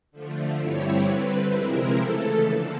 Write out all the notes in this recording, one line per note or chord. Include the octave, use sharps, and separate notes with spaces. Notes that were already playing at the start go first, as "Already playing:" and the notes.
D3 F3 A3
G2 D3 G3 C4 E4 C#5
D3 G3 C4 B4
C3 F3 G#3 C4 E4 A#4
C#3 E3 A3 A4
D3 F3 A#3